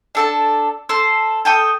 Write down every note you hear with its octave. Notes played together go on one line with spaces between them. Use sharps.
D4 A4 A5
A4 C5
A4 G5 D#6